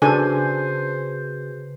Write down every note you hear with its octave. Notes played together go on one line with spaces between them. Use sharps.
C#3 D4 F#4 G#4 A4 B4 C5 G#5